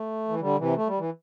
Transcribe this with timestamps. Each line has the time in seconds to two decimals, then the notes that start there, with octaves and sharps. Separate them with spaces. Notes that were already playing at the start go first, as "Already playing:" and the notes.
Already playing: A3
0.28 E3
0.40 D3 G3
0.58 C3 E3
0.76 A3
0.87 G3
0.99 E3